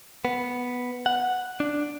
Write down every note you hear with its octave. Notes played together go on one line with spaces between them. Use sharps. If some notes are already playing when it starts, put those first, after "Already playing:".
B3
F#5
D4